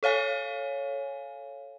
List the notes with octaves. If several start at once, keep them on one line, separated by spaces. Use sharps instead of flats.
A4 C#5 F5 G#5